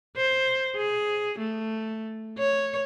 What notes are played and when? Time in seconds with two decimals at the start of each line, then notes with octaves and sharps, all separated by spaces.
0.16 C5
0.76 G#4
1.39 A3
2.38 C#5